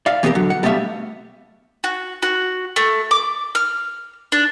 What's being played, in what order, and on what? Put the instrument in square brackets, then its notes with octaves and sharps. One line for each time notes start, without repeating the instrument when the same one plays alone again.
[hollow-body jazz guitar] D5 E5 F5
E3 B3 C4 F4 G4 A#4
D3 F#3
F#5
G3 A3 B3 G4 E5 F5
[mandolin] F#4
F#4
A3
D6
F6
D4